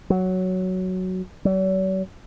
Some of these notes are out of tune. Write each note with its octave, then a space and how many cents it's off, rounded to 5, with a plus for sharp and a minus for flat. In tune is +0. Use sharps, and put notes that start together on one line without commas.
F#3 +5
F#3 +45